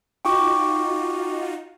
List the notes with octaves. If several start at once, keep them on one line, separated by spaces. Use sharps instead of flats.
D#4 F4 F#4 G5 C#6 D6